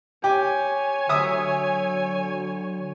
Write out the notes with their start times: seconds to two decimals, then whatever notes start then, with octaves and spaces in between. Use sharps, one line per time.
0.24 G4 C#5 G#5
1.09 D3 F#3 E5 D#6